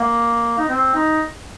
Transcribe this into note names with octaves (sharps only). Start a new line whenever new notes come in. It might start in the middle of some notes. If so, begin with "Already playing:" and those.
Already playing: A#3
D#4
C4
D#4